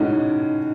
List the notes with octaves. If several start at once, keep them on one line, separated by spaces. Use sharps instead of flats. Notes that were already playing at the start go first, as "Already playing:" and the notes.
Already playing: A2 G#3 C#4 D#4 F#4